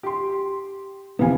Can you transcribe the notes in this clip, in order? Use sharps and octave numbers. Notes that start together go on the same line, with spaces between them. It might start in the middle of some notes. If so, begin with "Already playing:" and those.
G4 C6
D2 C3 E3 B3 F5 G#5